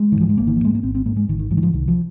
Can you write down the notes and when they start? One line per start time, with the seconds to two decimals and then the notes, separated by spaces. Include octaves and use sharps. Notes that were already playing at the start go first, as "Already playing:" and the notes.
Already playing: G#3
0.12 G#2 D#3
0.21 F3
0.29 G#3
0.38 G#1 A#3
0.47 D#3
0.56 F3
0.60 G#2 G#3
0.75 A#3
0.83 G#1 C4
0.95 C4
1.05 G#2 A#3
1.16 G#3
1.29 G#1 D#3
1.39 D#3
1.51 G#2 F3
1.57 D#3
1.63 F3
1.73 C2 D#3
1.88 F3